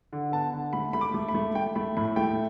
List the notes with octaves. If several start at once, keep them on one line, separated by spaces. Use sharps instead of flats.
D3
B3 A5
D3
A3 B5
A3 B5
D6
A3
B5
A3
A3 G5
A3 B5
A2 B5
A3 G5